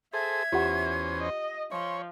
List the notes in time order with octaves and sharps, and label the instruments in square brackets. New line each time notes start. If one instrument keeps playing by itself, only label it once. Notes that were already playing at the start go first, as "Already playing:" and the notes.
[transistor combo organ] G#4 A4 C5 [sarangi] E5 [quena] G#6
[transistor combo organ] E2 C#4 C5 [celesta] F4 G4 F#5
[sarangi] D#5
[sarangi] F3 [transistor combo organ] C#5 [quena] C6